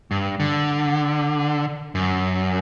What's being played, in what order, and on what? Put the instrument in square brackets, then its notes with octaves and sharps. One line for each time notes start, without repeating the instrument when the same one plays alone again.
[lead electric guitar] G2
D3
F#2